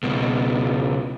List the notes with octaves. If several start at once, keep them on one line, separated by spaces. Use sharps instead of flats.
C#2 B2